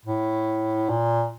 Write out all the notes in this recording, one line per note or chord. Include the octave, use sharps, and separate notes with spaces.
A2
A#2